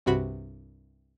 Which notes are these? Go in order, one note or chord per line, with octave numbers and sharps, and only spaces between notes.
C2 G2 C3 F#4 B5